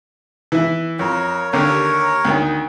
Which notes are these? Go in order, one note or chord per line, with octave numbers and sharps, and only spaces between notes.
E3 E4
F2 A#4 C#5
D#2 D3 G4 A#4 C#5
D2 D#3